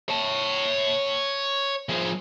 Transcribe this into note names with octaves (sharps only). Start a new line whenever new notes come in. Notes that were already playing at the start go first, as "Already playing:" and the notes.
C#5 A5
F3 G#4